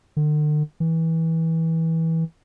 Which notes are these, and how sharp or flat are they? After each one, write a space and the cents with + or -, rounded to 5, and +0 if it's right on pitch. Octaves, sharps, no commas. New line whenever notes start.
D3 +45
E3 -20